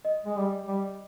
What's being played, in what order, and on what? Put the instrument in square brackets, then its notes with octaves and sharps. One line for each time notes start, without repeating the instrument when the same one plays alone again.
[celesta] D#5
[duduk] G#3
G3
G3